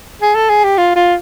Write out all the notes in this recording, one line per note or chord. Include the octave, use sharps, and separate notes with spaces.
G#4
A4
G#4
G4
F4
F4